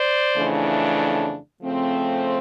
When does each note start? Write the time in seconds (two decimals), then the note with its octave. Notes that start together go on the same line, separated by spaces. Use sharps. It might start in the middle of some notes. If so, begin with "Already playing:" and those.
Already playing: C5 D5
0.37 F2 C#3 E3 A3 D4
1.62 C#3 F3 A3 C4